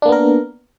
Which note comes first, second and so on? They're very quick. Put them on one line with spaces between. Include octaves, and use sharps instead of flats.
D4 A#3 B3 A#4